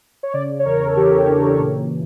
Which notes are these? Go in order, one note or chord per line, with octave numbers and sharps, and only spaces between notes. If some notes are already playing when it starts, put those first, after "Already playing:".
C#5
C#3 D5
C#5
E2 A#4
A4
E3 G4
C#3 D4
A#2